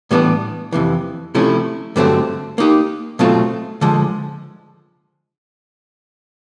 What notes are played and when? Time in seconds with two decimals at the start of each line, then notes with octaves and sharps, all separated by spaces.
0.11 A2 E3 G3 B3 D4
0.73 F2 C3 E3
1.35 C3 F3 A3 C#4 E4
1.96 G2 D3 F#3 A3 C4
2.58 A#3 D#4 G4
3.19 B2 F#3 A3 C4 F4
3.81 D3 F3 G#3